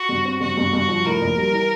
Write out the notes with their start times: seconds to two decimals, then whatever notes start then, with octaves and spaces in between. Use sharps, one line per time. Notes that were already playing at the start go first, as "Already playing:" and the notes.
Already playing: F#4
0.09 G2
0.25 C4
0.40 G2 F#4
0.57 G2
0.73 G2
0.88 F3
1.05 A2 A#4
1.21 A#1
1.37 G3
1.52 E3